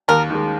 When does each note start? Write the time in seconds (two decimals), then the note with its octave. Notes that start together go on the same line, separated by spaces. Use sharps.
0.08 D#2 A#4
0.30 D#3 G#3